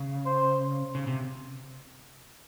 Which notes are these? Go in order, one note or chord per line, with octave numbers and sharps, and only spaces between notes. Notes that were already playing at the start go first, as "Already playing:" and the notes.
Already playing: C#3
C5
C#3
C3